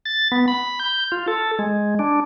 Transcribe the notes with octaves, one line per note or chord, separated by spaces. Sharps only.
A6
B3
B5
G6
F4
A4
G#3
D4